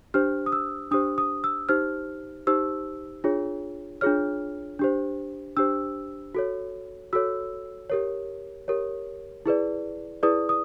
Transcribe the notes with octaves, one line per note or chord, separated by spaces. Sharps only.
D4 G4 C5 F6
D#6
E6
D4 G4 C5 D#6
D#6
E6
D#4 G4 C5 F6
D#4 G4 C5 E6
D4 F4 G#4 C#5
D4 F4 G#4 C#5 F6
D4 G4 C5
D4 G4 C5 E6
F#4 A4 C#5
F#4 A4 C#5 E6
G4 A#4 C#5
G4 A#4 C#5
E4 G#4 B4 D5
E4 G#4 B4 D5 D#6
D#6